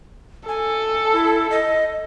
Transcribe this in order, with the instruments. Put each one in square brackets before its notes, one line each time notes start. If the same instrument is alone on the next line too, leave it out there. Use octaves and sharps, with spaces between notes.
[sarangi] A4 [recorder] G#5
[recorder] E4
D#5